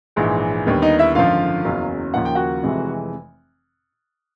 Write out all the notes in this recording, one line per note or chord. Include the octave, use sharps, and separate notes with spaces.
A#1 G#2 E3 G#3
D#2 D3 G3 B3
D#4 D#5
E4 E5
G#1 F#2 D3 F3 F4 F5
F#1 E2 C#3 F#3
D#2 C#3 F3 A#3 F#5
G5
F#4 F#5
F1 F2 C3 E3 G#3